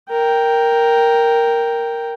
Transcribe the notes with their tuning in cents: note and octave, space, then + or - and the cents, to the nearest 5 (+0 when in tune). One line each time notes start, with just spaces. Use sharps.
A#4 +0 G5 +0